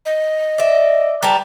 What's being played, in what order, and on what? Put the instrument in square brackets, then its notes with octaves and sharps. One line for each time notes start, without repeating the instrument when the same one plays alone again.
[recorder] D#5
[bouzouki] D5 E5
[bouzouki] G3 B4 A5 [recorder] A#5